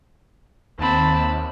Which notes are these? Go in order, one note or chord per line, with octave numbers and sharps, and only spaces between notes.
D#2 C4 A5 B5